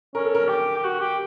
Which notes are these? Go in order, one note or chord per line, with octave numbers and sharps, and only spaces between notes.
C#4 A#4
A4
A#4
G4
G4
F#4
G4